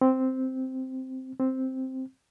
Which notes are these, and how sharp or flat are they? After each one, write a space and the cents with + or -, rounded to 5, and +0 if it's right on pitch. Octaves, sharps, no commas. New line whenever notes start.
C4 -5
C4 +0